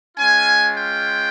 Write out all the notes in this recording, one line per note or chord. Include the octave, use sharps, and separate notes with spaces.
G#3 C#4 F4 G#5
G5